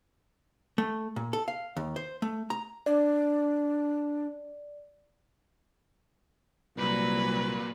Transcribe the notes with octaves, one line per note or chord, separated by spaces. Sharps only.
A3
A#2
A4
F5
D#2
C5
A3
A#5
D4 D5
C2 A#2 F#3 B4